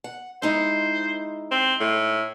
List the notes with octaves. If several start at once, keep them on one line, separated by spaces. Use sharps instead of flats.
F#5
G#3 D#4 E4 C5
C4
A2